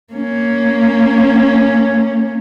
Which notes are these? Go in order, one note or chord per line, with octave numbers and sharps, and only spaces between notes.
A#3 C#4